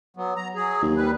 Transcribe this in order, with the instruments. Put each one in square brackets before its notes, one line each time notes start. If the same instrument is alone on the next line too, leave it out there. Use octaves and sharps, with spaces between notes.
[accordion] F#3 B3
A#5
F#3 G#4
[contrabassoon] D#2
[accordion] G3 B4